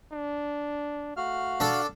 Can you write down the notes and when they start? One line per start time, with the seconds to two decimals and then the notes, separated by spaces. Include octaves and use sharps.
0.13 D4
1.17 A3 F#4 F5 F6
1.60 D4 A4